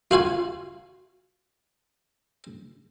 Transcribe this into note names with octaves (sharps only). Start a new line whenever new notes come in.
F4 F#4 F5 G#5